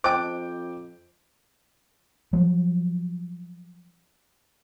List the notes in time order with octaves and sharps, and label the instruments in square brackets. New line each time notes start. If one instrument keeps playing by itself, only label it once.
[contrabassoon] F2 [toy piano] C5 D#5 A5 [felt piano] G5 D6
[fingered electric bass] F3 F#3